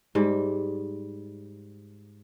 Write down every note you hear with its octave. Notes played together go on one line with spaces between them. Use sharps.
G#2 G3